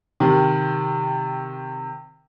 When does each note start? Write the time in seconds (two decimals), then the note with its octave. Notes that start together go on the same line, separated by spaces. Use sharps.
0.20 C3 D#3